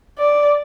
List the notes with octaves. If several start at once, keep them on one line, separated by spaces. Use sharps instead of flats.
D5